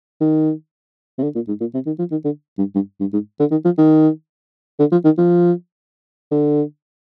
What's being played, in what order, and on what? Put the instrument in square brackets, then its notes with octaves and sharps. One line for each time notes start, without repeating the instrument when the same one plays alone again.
[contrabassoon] D#3
C3
D3
A#2
G#2
A#2
C3
D#3
F3
D#3
D3
G2
G2
G2
G#2
D3
D#3
F3
D#3
D3
F3
D#3
F3
D3